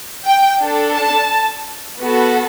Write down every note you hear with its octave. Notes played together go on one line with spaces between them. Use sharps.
G5
D4 A4
A5
B3 F#4 A4